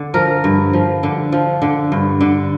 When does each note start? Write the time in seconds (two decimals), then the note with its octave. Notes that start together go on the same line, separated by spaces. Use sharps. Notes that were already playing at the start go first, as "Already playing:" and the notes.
Already playing: D3
0.14 F3 A#4
0.44 G2
0.73 F3
1.03 D3
1.32 F3
1.62 D3
1.92 G2
2.21 D3